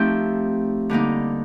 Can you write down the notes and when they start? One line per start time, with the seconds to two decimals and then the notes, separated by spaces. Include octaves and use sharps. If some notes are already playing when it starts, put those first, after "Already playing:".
Already playing: F3 A3 C4 D#4 G4
0.89 D3 G3 A#3 D#4